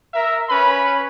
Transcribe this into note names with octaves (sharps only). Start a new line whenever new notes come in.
A#4 E5
C#4 B4 B5